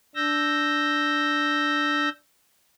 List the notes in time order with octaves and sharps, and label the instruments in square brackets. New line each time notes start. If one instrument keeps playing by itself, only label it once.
[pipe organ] D4 E6 G6 A#6